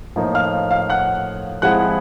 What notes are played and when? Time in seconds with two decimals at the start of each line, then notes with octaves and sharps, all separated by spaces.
0.16 A2 F3 A#3 D#4
0.35 F5 F6
0.71 F5 F6
0.90 F#5 F#6
1.62 F3 G#3 C4 E4 F#5 F#6